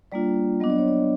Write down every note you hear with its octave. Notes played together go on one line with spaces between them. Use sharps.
G3 A#3 D4 F4 D5
F#3 B3 D4 D#5
D5
C#5
D5